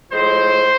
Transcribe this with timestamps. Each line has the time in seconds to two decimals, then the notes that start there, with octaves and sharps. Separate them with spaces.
0.11 A2 F3 G#3 C5